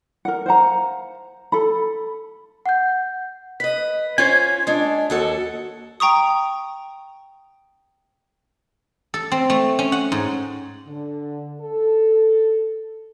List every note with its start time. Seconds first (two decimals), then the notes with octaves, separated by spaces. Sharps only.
0.25 A#4 F#5
0.46 C5 F5 F#5 A#5
1.52 A4 B5
2.66 F#5 G6
3.60 B4 D#5 B6
4.18 C#4 F4 C5 G#5
4.67 G#3 C#4 D4
5.10 D#2 F#4 A4
6.00 G5 A#5 C#6 D#6
9.14 A4
9.32 C4
9.50 A3
9.79 C#4
9.92 F#5
10.12 G#2
10.87 D3
11.61 A4